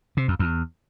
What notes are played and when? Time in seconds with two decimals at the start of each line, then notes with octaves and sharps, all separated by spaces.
0.17 C3
0.28 F2
0.39 E2